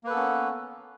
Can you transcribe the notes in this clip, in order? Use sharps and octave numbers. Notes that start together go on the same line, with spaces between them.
A#3 B3 C#4 A4 B4